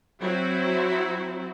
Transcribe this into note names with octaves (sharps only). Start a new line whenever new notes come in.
F#3 C4 E4 F#4